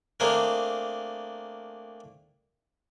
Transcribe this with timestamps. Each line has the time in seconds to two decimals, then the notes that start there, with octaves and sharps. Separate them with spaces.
0.20 A3 A#3 C4 D4 G#4 A#4